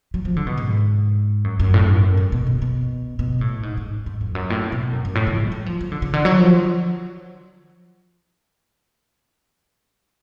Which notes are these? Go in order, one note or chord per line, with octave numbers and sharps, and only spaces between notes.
F#3
F3
D3
B2
G#2
F#2
F#2
A2
F#2
G#2
B2
B2
B2
B2
A2
G#2
G#2
G#2
F2
F#2
A2
B2
F#2
F#2
A2
C#3
G#3
F#3
F3
F3
D3
C#3
D3
F#3
F3